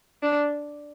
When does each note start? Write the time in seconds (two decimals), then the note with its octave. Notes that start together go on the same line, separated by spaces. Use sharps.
0.23 D4